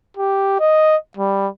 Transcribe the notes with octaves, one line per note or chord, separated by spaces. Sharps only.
G4
D#5
G3